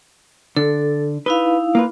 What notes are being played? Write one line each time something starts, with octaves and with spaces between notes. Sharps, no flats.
D3 A4
D#4 E4 B4 F5
A#3 F4 B4